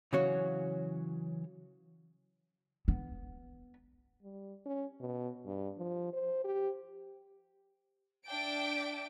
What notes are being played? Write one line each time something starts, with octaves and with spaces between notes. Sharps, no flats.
C#3 E3 F#3 C#4 F#4 C#5
B3
G3
C#4
B2
G2
F3
C5
G4
D4 E5 G5 A5 D6 D7